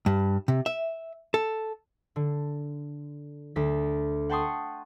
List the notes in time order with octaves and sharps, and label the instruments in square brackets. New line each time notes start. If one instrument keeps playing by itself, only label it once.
[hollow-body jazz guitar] G2
C3
E5
A4
[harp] D3
D2 B6
F#5 G5 A5 C6 C#6 D#6